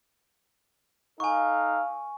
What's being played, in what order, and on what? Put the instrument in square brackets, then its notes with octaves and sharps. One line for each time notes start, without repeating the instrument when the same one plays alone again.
[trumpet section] D#4 A4 F5 [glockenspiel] G#5 C#6